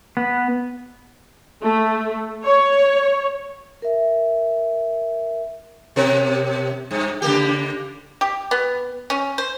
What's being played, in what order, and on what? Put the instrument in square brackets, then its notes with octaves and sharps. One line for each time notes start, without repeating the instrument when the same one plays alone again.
[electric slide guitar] B3
[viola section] A3
C#5
[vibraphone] A#4 E5
[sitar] B2 A#4
G2
C#3 A#3 G4
[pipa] G4
B3
C#4
C5